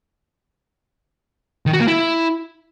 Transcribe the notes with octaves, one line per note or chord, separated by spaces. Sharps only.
D#3
F#4
A#3
E4